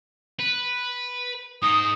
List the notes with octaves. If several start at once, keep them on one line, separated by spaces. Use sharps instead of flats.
B4
G#2 D#4 D#6